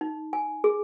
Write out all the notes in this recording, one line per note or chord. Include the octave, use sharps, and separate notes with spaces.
D#4
G#5
G#4